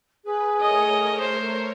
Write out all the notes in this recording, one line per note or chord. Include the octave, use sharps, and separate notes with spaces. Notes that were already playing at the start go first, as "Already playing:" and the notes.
G#4 B4
A3 A#4 C#5 D#5
C5